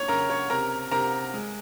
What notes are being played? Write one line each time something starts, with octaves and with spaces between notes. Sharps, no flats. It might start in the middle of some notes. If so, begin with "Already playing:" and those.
Already playing: A#3 C#5 C#6
C#3 A#4 A#5
C#5 C#6
C3 A#4 A#5
C3 A#4 A#5
G#3